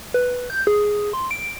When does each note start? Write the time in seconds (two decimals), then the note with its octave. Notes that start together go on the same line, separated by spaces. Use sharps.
0.14 B4
0.50 G6
0.67 G#4
1.13 C6
1.31 D7